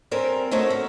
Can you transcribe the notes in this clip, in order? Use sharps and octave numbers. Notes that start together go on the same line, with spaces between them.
G3 C4 C#4 A#4
A3 C4 D#4 F#4 C#5 E5
C#4